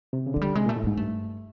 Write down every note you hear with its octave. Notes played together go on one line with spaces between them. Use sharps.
C3
C#3
D3 F#3
G3
C3 G#3
A#2 A3
A2
G#2 A#3
G2 A3